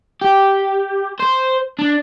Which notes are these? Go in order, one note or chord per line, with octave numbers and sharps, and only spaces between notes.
G4
C5
D4